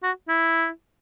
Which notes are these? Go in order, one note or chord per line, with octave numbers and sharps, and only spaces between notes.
F#4
E4